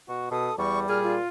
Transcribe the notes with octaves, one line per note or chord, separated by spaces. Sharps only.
B2 F#4
B2 A4 D#6
E2 G3 C#6
A#2 G#4 F6
F4